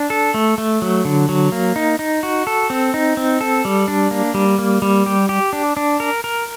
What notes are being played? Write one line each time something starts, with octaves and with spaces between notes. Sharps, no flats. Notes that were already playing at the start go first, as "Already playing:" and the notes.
Already playing: D4
A4
A3
A3
F#3
D3
F#3
A#3
D#4
D#4
F#4
A4
C4
D#4
C4
A4
G3
D4
A#3
G3
A#3
G3
G4
G4
D4
D4
A#4
A#4